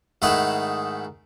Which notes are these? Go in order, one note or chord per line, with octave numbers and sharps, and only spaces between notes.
G#2 D#3 A3 E4 G#4 F#5